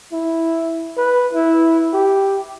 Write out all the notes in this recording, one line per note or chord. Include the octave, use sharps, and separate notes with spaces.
E4
B4
E4
G4